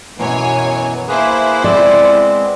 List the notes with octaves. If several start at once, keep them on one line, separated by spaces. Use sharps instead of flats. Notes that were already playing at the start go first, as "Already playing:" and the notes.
F#2 B2 E3 F#3 C#5 G#5
A#3 E4 G#4 B4 C5
G#3 B3 C4 D5